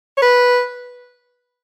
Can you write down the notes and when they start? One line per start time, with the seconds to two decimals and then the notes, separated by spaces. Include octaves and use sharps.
0.17 C#5
0.22 B4